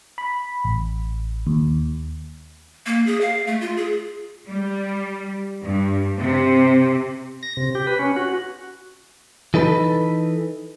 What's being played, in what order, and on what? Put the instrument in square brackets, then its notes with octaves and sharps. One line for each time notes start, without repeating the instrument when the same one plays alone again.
[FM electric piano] B5
A1
D#2
[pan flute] A#3
G#4
F5
A3
F4
G#4
[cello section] G3
G2
C3
[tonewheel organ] A#6
C3
G4
B4
C#4
F#4
[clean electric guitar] E3 D#4 A4 B4